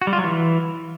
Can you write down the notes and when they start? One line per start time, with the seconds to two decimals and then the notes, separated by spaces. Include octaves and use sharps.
0.02 F#4
0.07 G3
0.13 F4
0.18 F#3
0.24 E3